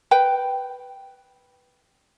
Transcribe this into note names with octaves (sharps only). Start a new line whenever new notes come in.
B4 G5